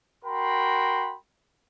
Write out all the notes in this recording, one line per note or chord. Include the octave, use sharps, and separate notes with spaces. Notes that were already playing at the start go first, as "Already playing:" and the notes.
F#4 A#4 G5 B5 C6